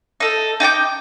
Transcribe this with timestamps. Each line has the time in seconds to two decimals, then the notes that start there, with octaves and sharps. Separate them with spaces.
0.20 D#4 A4
0.60 D#4 G5 A5 D6